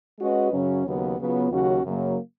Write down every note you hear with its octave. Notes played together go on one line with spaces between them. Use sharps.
G#3 C#4 F#4 B4 D#5
F#2 C#3 F#3 C#4
D#2 C#3 F#3 B3
C#3 F#3 B3 F4
D#2 C#3 F#3 C#4 F#4
F#2 C#3 F#3 A#3